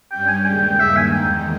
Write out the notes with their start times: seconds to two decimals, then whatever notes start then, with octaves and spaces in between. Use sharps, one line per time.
0.12 G2 G3 C#4 G5
0.28 G#5
0.46 D#2 C#3 G#3 G5
0.62 G5
0.80 G2 D#3 A#3 E5
0.97 G#5
1.14 E2 D#3 G#3 D#4 G5